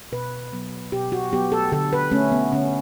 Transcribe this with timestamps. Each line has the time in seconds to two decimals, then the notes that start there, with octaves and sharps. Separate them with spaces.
0.12 B2 B4
0.53 F#3 B3
0.92 B2 G4
1.12 F#4
1.32 F#3 B3 G4
1.52 A4
1.72 D3 A4
1.93 B4
2.12 A3 C#4
2.32 B3
2.52 D3 C#4